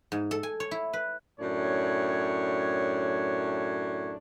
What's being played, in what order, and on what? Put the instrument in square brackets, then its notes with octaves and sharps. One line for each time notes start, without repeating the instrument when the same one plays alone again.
[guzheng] G#2
A4
G#5
C#5
E4
B4
[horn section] F#2 A2 D4 C#5